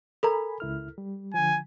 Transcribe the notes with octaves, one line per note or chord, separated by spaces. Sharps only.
A4 A#4 G#5 A#5 B5
C#2 E4 F6
G3
D3 F3 G#5